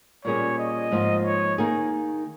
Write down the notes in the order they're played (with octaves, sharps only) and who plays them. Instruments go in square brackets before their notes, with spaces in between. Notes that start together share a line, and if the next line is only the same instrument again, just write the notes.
[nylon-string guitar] A#2 G3 A#3 C#4 G#4 [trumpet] C#5
[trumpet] D#5
[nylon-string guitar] G#2 F3 A#3 F4
[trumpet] C#5
[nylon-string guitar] D#3 A#3 D#4 G#4